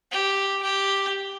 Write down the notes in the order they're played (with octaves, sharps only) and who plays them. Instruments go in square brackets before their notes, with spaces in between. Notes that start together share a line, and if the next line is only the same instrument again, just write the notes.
[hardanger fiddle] G4
G4